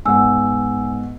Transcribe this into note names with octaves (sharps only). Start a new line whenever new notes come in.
G#2 B3 F#5 G#5 E6